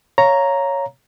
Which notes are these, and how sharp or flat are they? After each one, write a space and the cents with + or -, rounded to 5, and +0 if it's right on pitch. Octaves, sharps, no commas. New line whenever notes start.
C#5 +0 F5 -5 A#5 +0